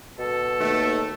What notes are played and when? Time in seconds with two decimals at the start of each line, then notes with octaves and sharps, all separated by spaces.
0.19 B2 A4
0.60 D#2 A3